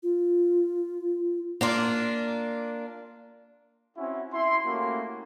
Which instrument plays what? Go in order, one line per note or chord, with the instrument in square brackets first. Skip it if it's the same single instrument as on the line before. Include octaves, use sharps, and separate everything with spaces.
[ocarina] F4
[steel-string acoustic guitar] A#3 D4 F4
[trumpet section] C4 C#4 E4 F#4
E4 C6
A3 A#3 C#4 E4 F#4 G4